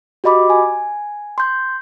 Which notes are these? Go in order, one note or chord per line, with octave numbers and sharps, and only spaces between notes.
F#4 G4 D#5 B5 D6
G#5
C6 G6